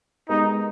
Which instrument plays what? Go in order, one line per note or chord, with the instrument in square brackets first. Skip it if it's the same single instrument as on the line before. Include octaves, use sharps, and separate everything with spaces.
[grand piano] G#3 B3 G4 A#4 [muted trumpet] D#4